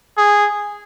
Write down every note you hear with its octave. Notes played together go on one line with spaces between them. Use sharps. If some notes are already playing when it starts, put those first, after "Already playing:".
G#4